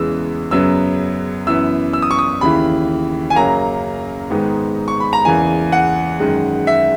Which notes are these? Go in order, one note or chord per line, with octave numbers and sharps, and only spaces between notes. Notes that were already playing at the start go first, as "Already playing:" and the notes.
Already playing: E2 C#3 E3 G#3 B3 E6
F#2 C#3 F#3 B3 E6
F#2 E3 B3 E6
E6
D#6
C#6
D#6
D#2 C#3 E3 B5
G#5
F#2 C#3 F#3 A#3 A#5
G#2 D#3 G#3 B3
C#6
B5
A#5
E2 C#3 E3 A#3 G#5
F#5
F#2 D#3 G#3
E5